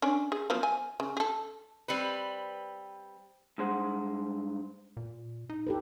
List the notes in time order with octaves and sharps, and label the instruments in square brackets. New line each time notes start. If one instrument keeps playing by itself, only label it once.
[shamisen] C#4 D4 C#5
G#4
F3 F#3 B3
G#5
C#3
G#4 A4
[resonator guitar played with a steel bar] G3 C4 B4
[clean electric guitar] G2 G#3 C5 F#5
[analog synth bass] A#2
D#4
[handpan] G4 A4 B4